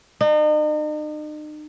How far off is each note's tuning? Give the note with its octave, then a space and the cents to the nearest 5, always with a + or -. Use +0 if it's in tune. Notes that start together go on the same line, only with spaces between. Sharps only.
D#4 -40